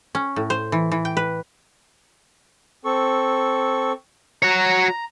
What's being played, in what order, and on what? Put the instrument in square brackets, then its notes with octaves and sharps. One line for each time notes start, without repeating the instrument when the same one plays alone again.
[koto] C#4
A2
C5
E3
E3
G5
B4
[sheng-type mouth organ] C4 A4 C#6
[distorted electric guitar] F#4 C#5 [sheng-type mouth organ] A#5